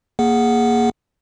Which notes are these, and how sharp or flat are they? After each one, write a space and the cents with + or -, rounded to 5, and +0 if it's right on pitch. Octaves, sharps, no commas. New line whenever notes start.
A#3 +0 G#4 +0 F#5 +0